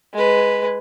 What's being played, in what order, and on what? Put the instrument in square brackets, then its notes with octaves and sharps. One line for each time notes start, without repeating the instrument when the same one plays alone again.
[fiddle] G#3 B4